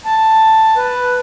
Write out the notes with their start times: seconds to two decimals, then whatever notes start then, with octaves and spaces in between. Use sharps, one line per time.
0.05 A5
0.77 B4